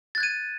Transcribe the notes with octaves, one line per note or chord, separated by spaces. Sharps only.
F#6 G#6 A6 D#7